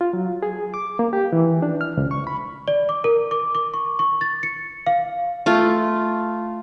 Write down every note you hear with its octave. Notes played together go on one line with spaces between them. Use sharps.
F4
F#3
G#4
D6
A#3
G4
E3
D4
F6
C#2
C#6
B5
D5
D6
A#4
D6
D6
C#6
C#6
A6
C#7
F5
A3 F4